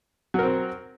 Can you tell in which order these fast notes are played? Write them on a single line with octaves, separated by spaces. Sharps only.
F#3 A#4 C4